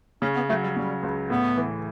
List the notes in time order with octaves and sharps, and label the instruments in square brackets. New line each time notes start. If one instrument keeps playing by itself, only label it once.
[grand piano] C#3 [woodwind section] C#4
[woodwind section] B3
[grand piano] F#3 [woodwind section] A3
[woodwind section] G3
[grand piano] C#3 [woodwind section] G3
[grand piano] C#2
[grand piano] A2 [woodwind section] B3
[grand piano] E3